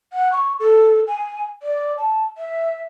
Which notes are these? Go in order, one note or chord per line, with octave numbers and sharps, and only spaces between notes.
F#5
C#6
A4
G#5
D5
A5
E5